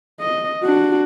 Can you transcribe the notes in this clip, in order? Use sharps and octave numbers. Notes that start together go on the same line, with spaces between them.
D#5
D4 F#4